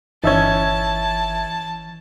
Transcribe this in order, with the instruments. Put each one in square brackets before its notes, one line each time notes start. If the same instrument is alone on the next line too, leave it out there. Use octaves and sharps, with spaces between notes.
[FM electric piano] G1 E5 G#6 [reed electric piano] E3 [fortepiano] C#4 D#4 [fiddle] A5